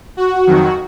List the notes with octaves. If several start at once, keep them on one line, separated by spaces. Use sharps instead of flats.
F#4
F2 D#3 F#3